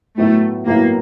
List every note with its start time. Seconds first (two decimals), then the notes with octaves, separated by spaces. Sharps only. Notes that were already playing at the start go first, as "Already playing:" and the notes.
0.17 A2 F#3 A3 B3 E4
0.66 A2 F#3 A#3 B3 E4